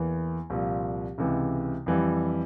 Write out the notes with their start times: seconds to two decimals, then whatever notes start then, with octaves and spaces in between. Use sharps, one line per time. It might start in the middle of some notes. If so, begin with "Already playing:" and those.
Already playing: E2 E3 A#3
0.50 C2 A#2 F3
1.18 C#2 C3 E3 G#3
1.86 F2 E3 G3